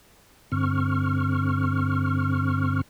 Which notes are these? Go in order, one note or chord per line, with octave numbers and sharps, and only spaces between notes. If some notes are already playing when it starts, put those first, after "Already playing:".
G2 D3 C4 C#6 F6